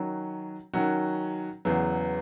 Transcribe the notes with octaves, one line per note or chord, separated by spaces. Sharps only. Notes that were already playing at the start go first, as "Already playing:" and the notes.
Already playing: D#3 F#3 C#4 F#4
D#3 F#3 C#4 F#4
E2 C#3 F#3 B3